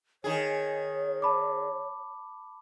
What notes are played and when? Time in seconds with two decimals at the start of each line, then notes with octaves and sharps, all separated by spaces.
0.24 D#3 G#4 C#5
1.22 A5 B5 D6